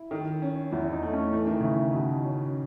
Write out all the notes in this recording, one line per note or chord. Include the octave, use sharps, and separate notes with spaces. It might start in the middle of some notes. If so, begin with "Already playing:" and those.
Already playing: E4
D#3
C#4
E2 E4
D#4
A3
C#4
E3 A3
D#3
C#3 E4
D#3
B2
C#4